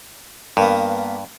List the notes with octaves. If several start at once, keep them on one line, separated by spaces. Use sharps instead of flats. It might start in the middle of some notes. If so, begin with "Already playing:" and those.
G2 A#3 B3